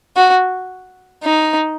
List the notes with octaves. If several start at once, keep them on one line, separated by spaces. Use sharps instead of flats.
F#4
D#4